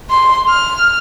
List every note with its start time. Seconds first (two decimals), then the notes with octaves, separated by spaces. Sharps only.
0.10 C6
0.49 F6